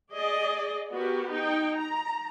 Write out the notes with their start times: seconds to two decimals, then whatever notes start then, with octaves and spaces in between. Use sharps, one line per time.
0.13 G#4 D5 D#5
0.93 B3 F#4 G4 A#4
1.33 D#4 G5
1.78 A#5